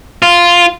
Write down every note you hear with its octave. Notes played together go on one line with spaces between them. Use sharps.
F4